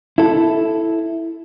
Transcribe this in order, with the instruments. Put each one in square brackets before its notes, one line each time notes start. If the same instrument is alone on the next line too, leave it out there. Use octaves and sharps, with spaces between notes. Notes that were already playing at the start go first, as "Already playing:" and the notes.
[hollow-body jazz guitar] E4 A4